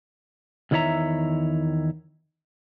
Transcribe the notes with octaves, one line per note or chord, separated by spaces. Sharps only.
E2 D#3 E4 C#5 E5 A#5